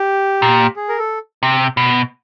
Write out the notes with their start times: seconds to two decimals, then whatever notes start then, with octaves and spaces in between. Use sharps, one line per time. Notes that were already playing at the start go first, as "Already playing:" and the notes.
Already playing: G4
0.42 A#2
0.76 G#4
0.89 A#4
0.98 A4
1.43 C3
1.77 B2